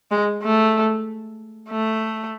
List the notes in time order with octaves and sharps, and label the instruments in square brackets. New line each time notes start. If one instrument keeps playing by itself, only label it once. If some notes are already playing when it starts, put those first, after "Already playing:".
[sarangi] G#3
A3
A3